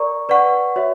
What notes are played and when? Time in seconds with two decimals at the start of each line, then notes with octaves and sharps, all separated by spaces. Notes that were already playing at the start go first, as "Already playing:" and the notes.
Already playing: A#4 D5 A#5 C#6
0.29 B4 D5 F#5 C#6
0.76 F#4 C#5 E5